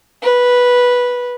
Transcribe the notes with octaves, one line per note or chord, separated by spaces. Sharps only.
B4